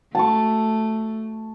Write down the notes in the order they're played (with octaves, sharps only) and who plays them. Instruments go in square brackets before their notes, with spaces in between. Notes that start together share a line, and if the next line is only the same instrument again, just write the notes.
[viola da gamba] A3 [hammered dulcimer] A5 C#6